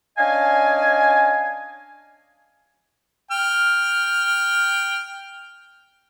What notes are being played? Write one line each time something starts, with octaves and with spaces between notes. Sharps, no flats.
C#4 D4 D#5 F5 G#5
G5 F6